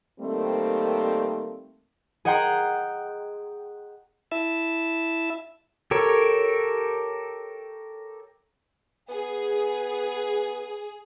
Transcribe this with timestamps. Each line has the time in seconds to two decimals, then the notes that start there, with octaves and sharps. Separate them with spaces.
0.20 D#3 G3 A3 A#3 C4
2.25 G#4 D#5 F#5 G5 A#5 C6
4.32 E4 E5 A5
5.91 G4 A4 A#4 C#5
9.09 B3 G#4